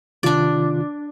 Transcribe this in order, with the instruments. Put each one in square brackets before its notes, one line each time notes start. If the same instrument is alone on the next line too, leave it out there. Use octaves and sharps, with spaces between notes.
[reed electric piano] C3 D#3 F4 [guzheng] D4 D5